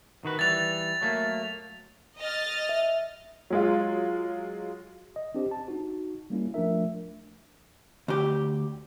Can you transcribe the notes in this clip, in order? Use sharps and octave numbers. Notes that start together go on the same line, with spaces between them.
D#3 F#4 B4
E3 G3 A6 F7
F#3 A3 A#3
D#5 F6 A6
E5
F#3 G#3 F4
D#5
C4 D4 G4 C5
A5
D#4 F#4
G3 A#3 C#4 E4
F3 A3 D4 A#4 E5
D2 G4